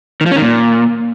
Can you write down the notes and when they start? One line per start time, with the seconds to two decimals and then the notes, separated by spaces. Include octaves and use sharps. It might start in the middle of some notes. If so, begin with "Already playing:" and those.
0.21 D#3
0.26 F3
0.31 C#4
0.36 D#3
0.41 A#2